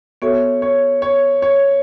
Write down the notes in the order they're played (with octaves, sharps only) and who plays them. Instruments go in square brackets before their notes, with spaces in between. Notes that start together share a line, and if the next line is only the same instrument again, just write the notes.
[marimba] B3 F#4 A4 E5 [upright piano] C#5
[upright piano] C#5
C#5
C#5